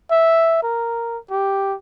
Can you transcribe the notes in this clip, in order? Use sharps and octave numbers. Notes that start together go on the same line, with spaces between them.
E5
A#4
G4